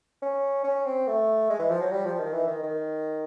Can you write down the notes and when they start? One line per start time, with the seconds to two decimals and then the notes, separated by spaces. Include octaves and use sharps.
0.22 C#4
0.64 C#4
0.86 C4
1.07 A3
1.50 G#3
1.59 E3
1.70 F3
1.81 F#3
1.92 G3
2.05 F3
2.19 D#3
2.33 E3
2.47 D#3
2.63 D#3